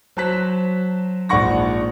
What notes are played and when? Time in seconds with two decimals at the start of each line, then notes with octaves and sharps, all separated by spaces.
0.17 F#3 C5 A5 F#6 B6
1.29 A#1 G#2 D5 F#5 C#6 A#6